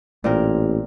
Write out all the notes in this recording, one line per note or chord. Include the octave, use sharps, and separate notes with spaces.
A1 A#2 C4 A#4